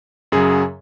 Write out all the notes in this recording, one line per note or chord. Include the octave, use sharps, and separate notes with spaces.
F#2 C#3 F#3 G#4